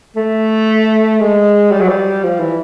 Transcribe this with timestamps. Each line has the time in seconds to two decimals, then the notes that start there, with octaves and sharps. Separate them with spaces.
0.16 A3
1.20 G#3
1.72 G3
1.81 F#3
1.89 G3
2.23 F3
2.40 E3